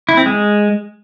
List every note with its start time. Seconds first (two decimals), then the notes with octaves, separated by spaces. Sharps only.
0.09 E4
0.17 C4
0.26 G#3